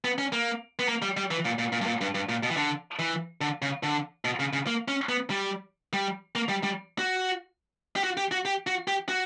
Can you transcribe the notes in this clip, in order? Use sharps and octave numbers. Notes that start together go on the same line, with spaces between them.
B3
C#4
A#3
B3
A#3
G3
G3
E3
A#2
A#2
A#2
G2
A#2
G2
G2
A#2
B2
E3
D3
E3
D3
C#3
D3
B2
C#3
C#3
A#3
C#4
B3
G3
G3
A#3
G3
G3
F#4
G4
F#4
G4
F#4
G4
F#4
G4
F#4